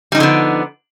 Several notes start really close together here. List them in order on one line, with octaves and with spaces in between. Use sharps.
G3 D#4 F3 D3 B3